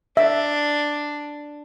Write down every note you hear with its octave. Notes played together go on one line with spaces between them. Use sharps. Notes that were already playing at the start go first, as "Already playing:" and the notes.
D4 E5